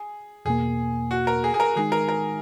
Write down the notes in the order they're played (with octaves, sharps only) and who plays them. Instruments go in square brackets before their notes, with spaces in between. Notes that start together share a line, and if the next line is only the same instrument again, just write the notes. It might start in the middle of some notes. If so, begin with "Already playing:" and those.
Already playing: [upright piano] G#4
[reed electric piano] E2 B2 A#3 [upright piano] G#4
[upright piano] F#4
A#4
G#4
G#4
A#4
[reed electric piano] D#3 G#3 D#4 [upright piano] G#4
[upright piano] A#4
A#4